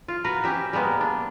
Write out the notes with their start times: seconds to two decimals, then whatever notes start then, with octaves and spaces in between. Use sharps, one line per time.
0.08 F4
0.24 F#4 A#4 B4
0.44 C#4 G4 E5
0.73 G3 G#3 A#3 B3
1.01 D4